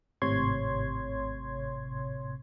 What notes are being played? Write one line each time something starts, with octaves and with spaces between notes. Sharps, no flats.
G#1 A2 C3 C#5 C6 G#6